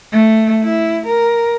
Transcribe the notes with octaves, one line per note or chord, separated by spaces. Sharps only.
A3
E4
A#4